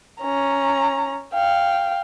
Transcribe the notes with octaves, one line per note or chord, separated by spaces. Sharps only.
C#4 A#5
F5 G5